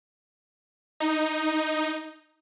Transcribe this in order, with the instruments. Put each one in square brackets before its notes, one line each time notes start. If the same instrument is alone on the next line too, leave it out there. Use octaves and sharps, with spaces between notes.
[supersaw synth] D#4